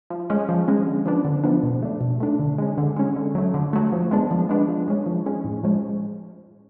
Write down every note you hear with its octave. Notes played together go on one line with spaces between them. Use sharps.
F3
G#3 C#4
F3
G#3 C#4
D3
F3 B3 D4
D3
F3 B3 D4
B2
A3 D4
B2
A3 D4
D3
G#3 C#4
D3
G#3 C#4
D3
F#3 A3
D3
F#3 A3
F3
G#3 B3 D4
F3
G#3 B3 D4
F3
G#3 C#4
F3
G#3 C#4
A2
F3 G#3 C#4